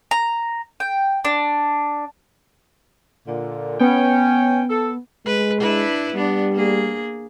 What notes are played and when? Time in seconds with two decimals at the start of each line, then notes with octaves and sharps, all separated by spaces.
0.11 A#5
0.80 G5
1.25 D4
3.26 A#2 D3
3.80 B3 C#4 G5
4.70 A4
5.26 G#3 B4
5.61 D4 E4 B4
6.14 G3 B3 D4
6.52 A#3 G#4